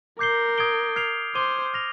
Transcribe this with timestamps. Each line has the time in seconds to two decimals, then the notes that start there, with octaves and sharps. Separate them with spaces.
0.19 A#4 D6 G6 C7 G7
0.58 D#6 G#6 D7 G7
0.96 F6 G#6 C7 F7
1.35 C5 D6 G#6 D#7 G7
1.74 F6 A#6 F7